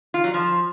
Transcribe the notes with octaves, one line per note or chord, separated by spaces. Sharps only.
F4
F#3
F3